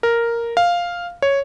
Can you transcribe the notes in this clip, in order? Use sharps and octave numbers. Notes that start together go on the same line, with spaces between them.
A#4
F5
C#5